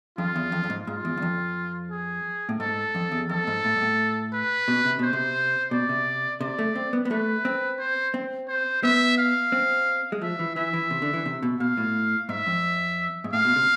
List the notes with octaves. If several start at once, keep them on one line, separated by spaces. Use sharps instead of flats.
F2 F4
E2
F2
F2
G#2
G#2 F4
E2
E2
F2
G#4
A2
G#2 A4
F2
E2
F2 A4
G#2
A2
G#2
A2
B4
B2
C3
B2 C5
C3
B2 D5
C3
C3 D5
A3
C4
B3
B3
A3 B4
C4
C5
C4
C5
B3 E5
F5
C4
G#3
F3 E5
E3
E3 E5
E3
C3
D3
E3
C3
B2
B2 F5
A2
G#2 E5
F2
G#2
A2 F5
B2
C3